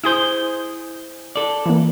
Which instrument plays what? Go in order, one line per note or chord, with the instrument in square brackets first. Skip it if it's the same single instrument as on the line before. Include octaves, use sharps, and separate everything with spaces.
[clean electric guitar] E4 G#4 C5 [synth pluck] D#6 G6
[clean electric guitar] A4 D5
[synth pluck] E3 A#3